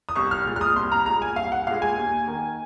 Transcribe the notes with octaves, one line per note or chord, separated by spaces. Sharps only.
D#6
C2 C#6
F6
A#2 G#3
F6
D#6
C2 C6
A#5
A#2 G#3 A#5
G#5
C2 F5
F#5
A#2 G#3 F5
G#5
D#2
D#3 A#3